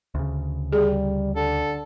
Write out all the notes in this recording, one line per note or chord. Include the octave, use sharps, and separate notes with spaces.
D2 C#3
G3 G#4
D3 A4